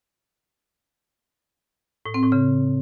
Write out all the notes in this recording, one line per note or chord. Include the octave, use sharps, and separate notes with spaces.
A2
C4
A2
C#3